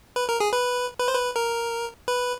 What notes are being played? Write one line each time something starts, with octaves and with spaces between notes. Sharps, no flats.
B4
A#4
G#4
B4
B4
C5
B4
A#4
B4